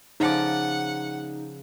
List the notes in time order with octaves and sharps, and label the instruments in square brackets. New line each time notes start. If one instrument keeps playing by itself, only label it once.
[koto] C#3 F3 D5 [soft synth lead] D#4 [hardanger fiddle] F#5